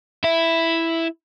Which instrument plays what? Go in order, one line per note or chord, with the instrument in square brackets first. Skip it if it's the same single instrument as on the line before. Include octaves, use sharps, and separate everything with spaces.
[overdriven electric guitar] E4 E5